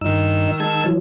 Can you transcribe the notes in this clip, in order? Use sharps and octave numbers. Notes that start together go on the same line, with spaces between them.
G2 D#3 D#4 E6
G#3 A5 G#6
E3 F#3